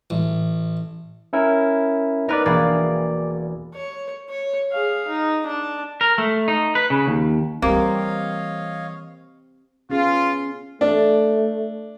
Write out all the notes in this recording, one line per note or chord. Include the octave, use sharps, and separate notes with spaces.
A1
C#4 E4 A#4
B3 D#4 A#4 B4 D5 F6
E1 A#3 G#4 D5
C#5
C#5
G#4 F5
D#4
D4 A5
A#4
A3
D#4
B4
C#3
D#2
E3 G3 A#3 C4 G4 C#5 D#5 F5
B3 C#4 F4 G#4
A3 D4